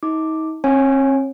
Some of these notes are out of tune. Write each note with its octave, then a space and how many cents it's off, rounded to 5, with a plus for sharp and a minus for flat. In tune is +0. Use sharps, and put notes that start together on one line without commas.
D#4 +35 D6 +0
C4 +45 C#5 -20 G#5 +0